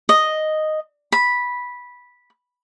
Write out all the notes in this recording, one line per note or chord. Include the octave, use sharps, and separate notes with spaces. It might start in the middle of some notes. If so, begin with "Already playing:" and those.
D#5
B5